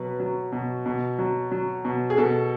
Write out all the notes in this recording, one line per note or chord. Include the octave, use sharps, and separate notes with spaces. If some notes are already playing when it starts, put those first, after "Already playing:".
Already playing: B2 F#3 B4
F#3
B2
B2
F#3
F#3
B2
G#4
B2 A4